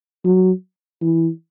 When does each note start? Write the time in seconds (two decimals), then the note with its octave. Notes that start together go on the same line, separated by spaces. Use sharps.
0.25 F#3
1.02 E3